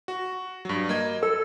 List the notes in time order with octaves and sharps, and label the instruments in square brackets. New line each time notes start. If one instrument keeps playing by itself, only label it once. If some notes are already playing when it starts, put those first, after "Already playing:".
[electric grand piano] F#4
G2 F#3
A#3 D#5 G#6
[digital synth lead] A4 [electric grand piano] E6